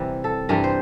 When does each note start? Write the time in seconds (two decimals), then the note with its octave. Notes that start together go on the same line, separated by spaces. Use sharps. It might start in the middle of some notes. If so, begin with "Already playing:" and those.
Already playing: C3 E3 G3 A#4
0.24 A4
0.49 G2 E3 G3 A#4
0.64 C5